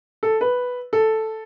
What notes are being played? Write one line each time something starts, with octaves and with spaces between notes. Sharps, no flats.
A4
B4
A4